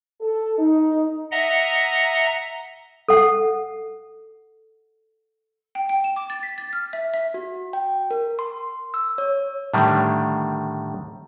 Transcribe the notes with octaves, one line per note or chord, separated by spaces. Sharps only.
A4
D#4
D#5 E5 F#5 A#5
A4 F#5
G5
G5
E7
D6
A6
B6
A6
F6
E5
E5
F#4
G5
A#4
C6
E6
C#5
A2 D3 D#3 G3